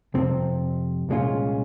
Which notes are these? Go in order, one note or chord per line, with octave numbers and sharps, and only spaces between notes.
F2 C3 F3 C4
C2 A#2 G#3 C#4 F4